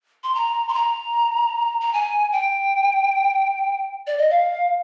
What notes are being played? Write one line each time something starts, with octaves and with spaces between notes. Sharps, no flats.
C6
A#5
C6
A#5
A#5
G#5
G5
D5
D#5
F5